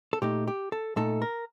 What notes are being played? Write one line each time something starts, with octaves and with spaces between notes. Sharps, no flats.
A4
A#2 A3 D#4 G4
G4
A4
A#2 A3 D#4 A4
A#4